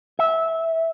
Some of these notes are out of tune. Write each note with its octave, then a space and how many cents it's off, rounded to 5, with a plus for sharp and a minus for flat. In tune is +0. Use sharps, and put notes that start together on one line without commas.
E5 -15